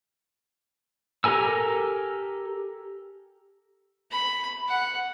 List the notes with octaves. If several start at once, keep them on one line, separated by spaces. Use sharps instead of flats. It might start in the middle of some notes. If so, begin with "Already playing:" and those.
G4 A4 A#4 G#5 E6
B5
F#5